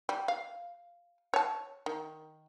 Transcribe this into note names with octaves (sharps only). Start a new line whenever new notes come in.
G3
F5
C#5 A5
D#3